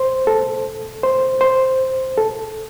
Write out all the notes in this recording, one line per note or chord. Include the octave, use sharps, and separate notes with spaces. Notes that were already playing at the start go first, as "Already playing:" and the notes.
Already playing: C5
A4
C5
C5
A4